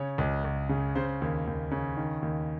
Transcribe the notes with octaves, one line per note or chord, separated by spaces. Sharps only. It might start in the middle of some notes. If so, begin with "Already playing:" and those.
Already playing: C#3 C#5
C#2
C#2
C#3
C#3 C5
D#2
D#2
C#3
D#3
D#2